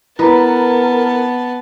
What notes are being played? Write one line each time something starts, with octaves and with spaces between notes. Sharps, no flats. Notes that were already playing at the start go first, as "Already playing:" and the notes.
B3 E4 A#4 B4 D#5 A5 A#5